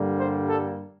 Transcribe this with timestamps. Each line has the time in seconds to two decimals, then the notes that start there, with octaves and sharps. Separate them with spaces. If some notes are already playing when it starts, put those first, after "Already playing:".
Already playing: G2 D3 G3 A#3
0.17 C5
0.47 A4